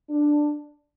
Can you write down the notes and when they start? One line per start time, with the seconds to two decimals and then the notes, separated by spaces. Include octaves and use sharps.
0.09 D4